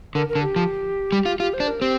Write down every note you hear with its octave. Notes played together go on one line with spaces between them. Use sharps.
D3 A#4
A#4
D3
G4
F3
G3
F4
F4 G4
C5
D4
A#4
C4 G4